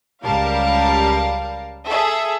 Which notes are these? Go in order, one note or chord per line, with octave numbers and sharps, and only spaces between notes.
C#2 G3 A#4 F5 A5
G#4 A4 E5